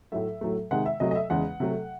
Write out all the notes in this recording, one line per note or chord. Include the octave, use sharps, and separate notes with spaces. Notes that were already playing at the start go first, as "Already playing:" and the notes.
A2 F#3 A3 E5
A2 F#3 A3
C3 D#3 G#3 F#5
E5
C3 F#3 A3 D#5
D#5
E5
E2 C#3 G#3 F#5
C3 F#3 A3